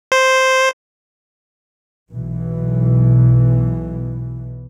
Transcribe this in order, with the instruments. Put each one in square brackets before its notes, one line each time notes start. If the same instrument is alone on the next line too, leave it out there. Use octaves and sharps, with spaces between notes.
[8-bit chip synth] C5
[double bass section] B1 B2 E3